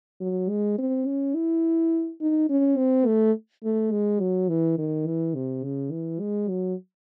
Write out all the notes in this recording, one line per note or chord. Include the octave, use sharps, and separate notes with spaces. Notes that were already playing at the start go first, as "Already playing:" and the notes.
F#3
G#3
C4
C#4
E4
D#4
C#4
C4
A3
A3
G#3
F#3
E3
D#3
E3
C3
C#3
E3
G#3
F#3